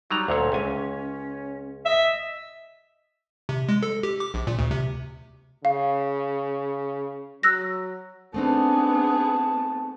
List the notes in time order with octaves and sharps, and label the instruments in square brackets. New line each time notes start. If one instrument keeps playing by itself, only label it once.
[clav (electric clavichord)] F#3 G3 A#5 [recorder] D#4
[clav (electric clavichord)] D2 A#2 C#5 [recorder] A4
[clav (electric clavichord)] C#2 G#5 [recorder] C#4
[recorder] D#5 [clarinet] E5
[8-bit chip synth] C3
G#3
A4
G4
D6
A#1
A#2
D2
C3
[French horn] C#3 [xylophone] F5
[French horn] F#3 [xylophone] E6 F#6 A#6
[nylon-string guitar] A3 C4 D#4 [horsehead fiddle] B3 G#4 [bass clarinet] D4 [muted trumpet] A5